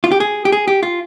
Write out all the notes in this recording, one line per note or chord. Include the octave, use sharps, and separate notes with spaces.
F4
G4
G#4
G4
G#4
G4
F4